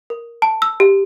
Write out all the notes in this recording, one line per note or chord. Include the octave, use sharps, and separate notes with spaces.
A#4
A5
E6
G4